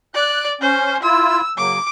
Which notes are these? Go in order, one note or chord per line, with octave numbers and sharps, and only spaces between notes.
D5 F#6
C#4 C5
E4 F4 E6
C#3 F#3 A#3 D6